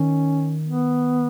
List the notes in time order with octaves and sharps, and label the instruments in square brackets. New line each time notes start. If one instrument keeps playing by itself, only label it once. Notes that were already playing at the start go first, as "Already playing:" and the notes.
Already playing: [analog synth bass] D#3 [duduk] C#4
[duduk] B3